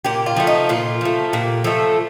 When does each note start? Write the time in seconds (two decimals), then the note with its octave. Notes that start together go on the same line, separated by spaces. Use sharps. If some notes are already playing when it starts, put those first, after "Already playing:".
0.05 A#2 G4
0.26 F4
0.36 F3 A3
0.47 D#4
0.69 A#2 F4
1.01 F3 A3
1.33 A#2 G4
1.64 F3 A3 A4